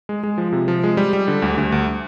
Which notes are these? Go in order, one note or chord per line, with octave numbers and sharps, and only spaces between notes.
G#3
G#3
F3
C3
F3
G#3
G3
G3
D3
D2
D2
D2